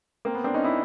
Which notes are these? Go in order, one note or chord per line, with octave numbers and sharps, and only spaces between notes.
A#3 C4
B3
C4 D4
C#4 D#4
D4 E4